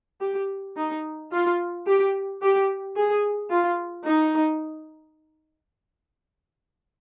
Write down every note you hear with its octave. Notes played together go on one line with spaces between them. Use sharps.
G4
D#4
F4
G4
G4
G#4
F4
D#4